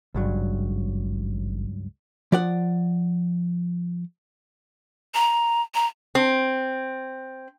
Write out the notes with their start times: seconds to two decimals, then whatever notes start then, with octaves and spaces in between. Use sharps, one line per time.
0.14 G#1 C#2 G2 F#3
2.32 F3 D5 F#5
5.14 A#5
5.75 A#5
6.15 C4